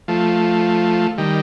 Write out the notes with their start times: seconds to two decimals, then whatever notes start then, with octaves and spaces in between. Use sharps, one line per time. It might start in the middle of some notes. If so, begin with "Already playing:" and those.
0.08 F3 A3
1.18 D#3 G3